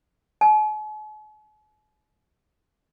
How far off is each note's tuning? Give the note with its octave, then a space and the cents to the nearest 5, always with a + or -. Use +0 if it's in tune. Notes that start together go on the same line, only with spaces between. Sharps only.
G#5 +45